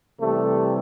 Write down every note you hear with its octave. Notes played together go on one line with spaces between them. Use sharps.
C3 E3 G3 A3